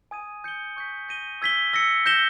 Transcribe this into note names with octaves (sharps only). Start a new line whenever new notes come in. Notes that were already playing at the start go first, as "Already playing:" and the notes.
G#5 D#6 G#6 D#7
G6 C#7 G7
C#6 G6 B6
G6 A#6 D#7 G7
E6 G#6 B6 G7
E6 A#6 C#7
G6 A#6 E7 G7